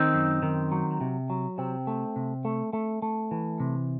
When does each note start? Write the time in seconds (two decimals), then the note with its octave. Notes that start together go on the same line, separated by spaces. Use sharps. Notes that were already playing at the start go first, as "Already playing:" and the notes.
Already playing: D#3 C4 D#4
0.14 F#2
0.43 D#3
0.72 F#3
1.01 C3
1.30 F#3
1.58 C3 C4
1.87 A3
2.16 C3
2.45 A3
2.73 A3
3.02 A3
3.31 E3
3.60 C3